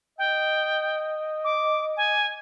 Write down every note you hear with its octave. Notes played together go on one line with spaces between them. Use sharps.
D#5 G5
D6
G#5